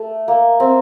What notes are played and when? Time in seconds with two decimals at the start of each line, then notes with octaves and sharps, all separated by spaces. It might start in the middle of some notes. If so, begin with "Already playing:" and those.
Already playing: A3
0.28 A#3
0.60 C4